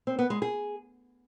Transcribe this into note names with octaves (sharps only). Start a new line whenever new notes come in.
C4
B3
G#3
G#4